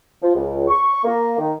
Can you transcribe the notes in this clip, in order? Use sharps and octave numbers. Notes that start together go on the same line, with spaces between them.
F3
C#2
C#6
A#3
D#3